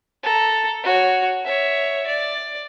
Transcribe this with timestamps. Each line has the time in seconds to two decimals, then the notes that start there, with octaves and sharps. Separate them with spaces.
0.23 A4 A#5
0.84 F#4 C#5
1.45 C#5 E5
2.06 D5